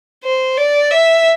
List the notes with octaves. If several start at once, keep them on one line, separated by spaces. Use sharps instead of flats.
C5
D5
E5